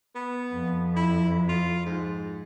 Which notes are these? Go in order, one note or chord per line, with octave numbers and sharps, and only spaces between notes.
B3
F2
E4
F4
G#2